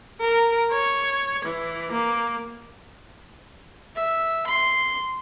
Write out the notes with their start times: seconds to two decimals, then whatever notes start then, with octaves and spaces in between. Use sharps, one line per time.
0.20 A#4
0.71 C#5
1.45 E3
1.92 A#3
3.96 E5
4.47 C6